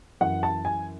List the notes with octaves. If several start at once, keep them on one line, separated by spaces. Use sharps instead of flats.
F#2 E3 F#5
A5
G#5